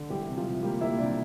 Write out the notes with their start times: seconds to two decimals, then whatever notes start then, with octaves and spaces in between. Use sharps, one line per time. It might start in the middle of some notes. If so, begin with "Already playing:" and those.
Already playing: D3
0.10 E3 G3 G4
0.27 C3
0.37 F3 F4
0.46 C3
0.62 G3 A#3 G4
0.81 A#3 E4 E5
0.98 C3 D4 D5